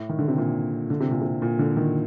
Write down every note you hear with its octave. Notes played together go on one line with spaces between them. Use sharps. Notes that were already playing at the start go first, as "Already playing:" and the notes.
Already playing: A2
D#3
D3
C3
A#2
D3
C3
A#2
C3
A#2
D3
D#3